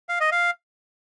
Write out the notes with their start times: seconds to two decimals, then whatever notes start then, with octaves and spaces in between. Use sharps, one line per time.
0.09 F5
0.20 D#5
0.32 F5